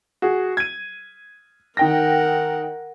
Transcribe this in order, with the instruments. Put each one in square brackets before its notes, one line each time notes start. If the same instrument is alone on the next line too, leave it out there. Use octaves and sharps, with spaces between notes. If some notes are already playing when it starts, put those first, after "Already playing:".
[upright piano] F#4 G#4
G#6 D#7
[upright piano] D#3 G5 A#6 [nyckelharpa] A#4 F#5